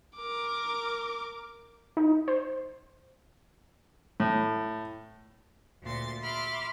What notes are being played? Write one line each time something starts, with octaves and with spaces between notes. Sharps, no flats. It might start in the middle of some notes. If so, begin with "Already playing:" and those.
A#4 D6
D#4
C5
A2
D2 A#2 C6 A6
E5 B5 C6 D6 F6